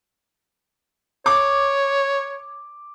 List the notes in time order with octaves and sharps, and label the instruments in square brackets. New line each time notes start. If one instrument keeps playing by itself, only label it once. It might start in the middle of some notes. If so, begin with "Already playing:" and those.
[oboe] C#5 [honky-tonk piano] D6